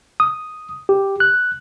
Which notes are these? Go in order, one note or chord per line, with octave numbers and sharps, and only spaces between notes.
D#6
G4
F#6